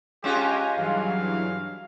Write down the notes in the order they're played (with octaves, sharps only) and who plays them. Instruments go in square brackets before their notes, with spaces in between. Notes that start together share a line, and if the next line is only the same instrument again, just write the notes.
[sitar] G#3 C#4 F4 [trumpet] G4 [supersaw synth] G#5 A#5
[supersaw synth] G2 E3 F#3 [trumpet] F5